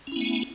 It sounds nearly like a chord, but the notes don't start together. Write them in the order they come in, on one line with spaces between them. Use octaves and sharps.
C#4 E4 B3 A3